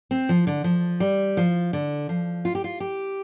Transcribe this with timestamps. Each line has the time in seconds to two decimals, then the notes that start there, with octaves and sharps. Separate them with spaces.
0.11 C4
0.29 F3
0.47 D3
0.64 F3
1.00 G3
1.37 F3
1.73 D3
2.09 F3
2.45 F4
2.55 G4
2.64 F4
2.80 G4